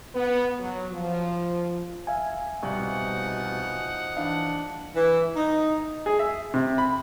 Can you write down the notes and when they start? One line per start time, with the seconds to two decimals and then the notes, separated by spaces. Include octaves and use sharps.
0.15 B3
0.60 F#3
0.92 F3
2.07 E5 F5 G#5
2.63 C2 B2 F3 D#4 F#5
4.17 E3 D4 F5
4.96 E3
5.36 D#4
6.06 G#4
6.19 E5
6.54 C3
6.78 B5